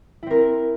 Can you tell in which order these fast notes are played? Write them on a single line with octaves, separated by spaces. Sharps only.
E4 C4 A#4